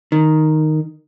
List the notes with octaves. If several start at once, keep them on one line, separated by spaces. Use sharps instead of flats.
D#3